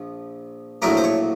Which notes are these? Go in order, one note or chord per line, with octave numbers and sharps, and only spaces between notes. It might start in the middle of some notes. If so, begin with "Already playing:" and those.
Already playing: A#1 F3
A#1 A2 F#3 A3 A#4
C5
C#5